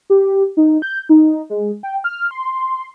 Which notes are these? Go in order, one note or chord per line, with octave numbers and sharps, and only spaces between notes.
G4
D#4
G6
D#4
G#3
G5
F6
C6